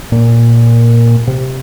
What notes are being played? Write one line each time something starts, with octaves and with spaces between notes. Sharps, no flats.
A#2
C3